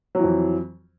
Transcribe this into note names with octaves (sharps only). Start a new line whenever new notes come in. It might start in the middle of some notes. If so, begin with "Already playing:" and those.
F2 E3 F#3